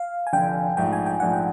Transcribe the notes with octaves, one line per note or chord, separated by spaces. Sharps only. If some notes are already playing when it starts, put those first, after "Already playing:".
Already playing: F5
G#5
F1 F2 D3 G5
A#1 G#2 F3 A3 G5
G#5
G5
A#1 G#2 F3 A3 F#5
G5